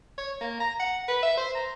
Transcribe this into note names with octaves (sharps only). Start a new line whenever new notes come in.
C#5
A#3
A#5
F#5
B4
E5
C5
A#5